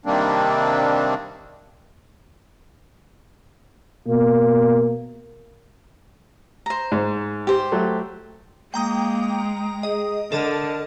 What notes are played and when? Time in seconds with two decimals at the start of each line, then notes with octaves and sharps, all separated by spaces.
0.06 C3 D#3 G3 A#3 C4 D4
4.08 B2 A#3
6.66 C5 A#5
6.92 G#2
7.47 G4 C5
7.72 F#3 A3
8.74 G#3 A#3 G5 A#5 D#6
9.83 G#4 D#5
10.32 D3 A4 A#4 D#5 A5